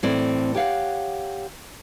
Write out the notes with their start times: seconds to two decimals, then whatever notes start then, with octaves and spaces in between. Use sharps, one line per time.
0.03 A2 E3 C4 D5
0.54 G4 C#5 F5 F#5